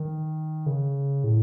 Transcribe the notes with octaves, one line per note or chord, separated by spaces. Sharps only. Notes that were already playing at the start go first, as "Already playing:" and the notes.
Already playing: D#3
C#3
A2